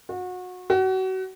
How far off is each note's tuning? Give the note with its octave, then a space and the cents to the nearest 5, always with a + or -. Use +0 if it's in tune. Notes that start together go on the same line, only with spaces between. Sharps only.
F#4 -30
F#4 +30